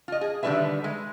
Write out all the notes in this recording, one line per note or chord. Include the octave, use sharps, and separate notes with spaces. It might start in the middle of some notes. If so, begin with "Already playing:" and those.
F4 D#5
G#4
D3 D#3 G3 E4 B4 E5
G#3